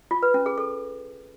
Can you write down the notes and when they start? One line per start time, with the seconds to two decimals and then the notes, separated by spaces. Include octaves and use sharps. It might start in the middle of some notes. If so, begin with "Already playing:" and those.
0.11 F4
0.23 B4
0.34 C#4
0.46 G#4
0.58 A4